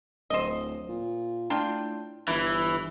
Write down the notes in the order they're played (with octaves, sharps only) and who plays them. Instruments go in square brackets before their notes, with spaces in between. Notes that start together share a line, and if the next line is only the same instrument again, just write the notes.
[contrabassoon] D1 [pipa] C5 D#5
[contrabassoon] A#2
[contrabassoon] A2 [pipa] D4 F4 G5
[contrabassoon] G1 [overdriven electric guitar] E3 [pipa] E4